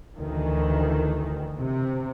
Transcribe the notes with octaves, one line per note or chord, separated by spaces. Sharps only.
D2 D#3 E3
C3